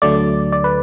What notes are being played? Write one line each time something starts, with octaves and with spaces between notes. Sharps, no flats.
D2 D3 F#3 A3 D5
D5
B4